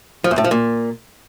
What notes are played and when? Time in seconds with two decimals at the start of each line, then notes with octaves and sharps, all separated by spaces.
0.24 F3
0.31 E2
0.38 A2
0.44 F3
0.51 A#2